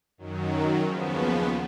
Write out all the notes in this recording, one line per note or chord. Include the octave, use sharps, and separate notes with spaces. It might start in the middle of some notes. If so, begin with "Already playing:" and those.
F#2 D#3 F#3
D#2 C#3 F3 B3